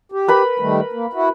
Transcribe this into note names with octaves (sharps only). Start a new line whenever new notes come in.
G4
A#4 B4 B5
D#3 G3 A3
A#3
E4 F#4